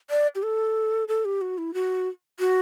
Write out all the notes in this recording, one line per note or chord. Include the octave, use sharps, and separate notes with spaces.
D5
G4
A4
A4
G4
F#4
E4
F#4
F#4